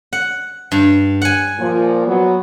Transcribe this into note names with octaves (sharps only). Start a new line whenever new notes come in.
F#5
G2
F#5 G#5
A#2 F3
F#3 B3